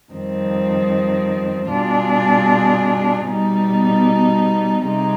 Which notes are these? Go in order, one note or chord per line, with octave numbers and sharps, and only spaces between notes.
F2 D#3 G3 C4
B2 G3 D4 F4 G#4
B2 G3 B3 D#4
C3 G3 C4 D#4 G#4